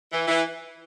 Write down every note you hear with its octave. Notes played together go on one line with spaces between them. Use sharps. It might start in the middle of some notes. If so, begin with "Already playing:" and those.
E3
E3